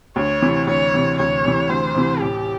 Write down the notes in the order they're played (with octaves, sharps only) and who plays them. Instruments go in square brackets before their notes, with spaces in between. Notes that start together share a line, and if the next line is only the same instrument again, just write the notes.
[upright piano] D2 [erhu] C#5
[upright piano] C3 E3
[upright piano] D2 [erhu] C#5
[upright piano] C3 E3
[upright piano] D2 [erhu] C#5
[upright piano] C3 E3
[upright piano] D2 [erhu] C5
[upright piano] C3 E3
[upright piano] A1 [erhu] G4